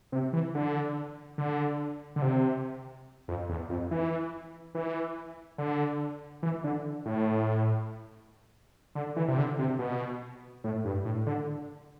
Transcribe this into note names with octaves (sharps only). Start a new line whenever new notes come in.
C3
E3
D3
D3
D3
C3
F2
E2
F2
E3
E3
D3
E3
D3
A2
D3
E3
C3
D3
C3
B2
A2
G2
A2
D3